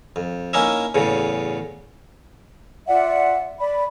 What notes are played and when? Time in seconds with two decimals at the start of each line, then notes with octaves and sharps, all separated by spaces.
0.16 F2
0.53 A#3 C#4 D#4 E4 E5
0.95 E2 A2 C#3
2.87 F4 D5 E5 F#5
3.59 D5 B5